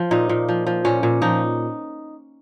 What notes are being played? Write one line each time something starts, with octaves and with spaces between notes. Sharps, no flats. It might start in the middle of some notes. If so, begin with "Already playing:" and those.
Already playing: F3 F4
A#2 D#4
A#2
F3
F3
A#2 C#4
A#2
F3 D#4